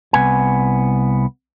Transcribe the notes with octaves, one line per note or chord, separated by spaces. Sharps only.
C2 B3 G#5